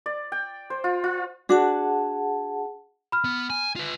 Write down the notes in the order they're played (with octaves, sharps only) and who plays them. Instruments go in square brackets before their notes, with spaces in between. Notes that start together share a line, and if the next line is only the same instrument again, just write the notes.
[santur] D5
G5
C5
F4
F4
[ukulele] D4 F#4 [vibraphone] G#4 F#5 A5
[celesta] B5 F6
[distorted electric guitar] B3
G#5
F4 B4